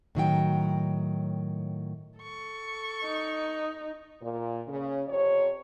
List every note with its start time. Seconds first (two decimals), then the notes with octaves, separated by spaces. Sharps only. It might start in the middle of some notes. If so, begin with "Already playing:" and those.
0.15 A2 D#3 F#3 G5
2.19 A4 C#6
3.05 D#4
4.22 A#2
4.67 C#3
5.08 F2 C3 C#5